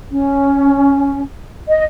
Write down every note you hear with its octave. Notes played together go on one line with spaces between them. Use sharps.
C#4
D#5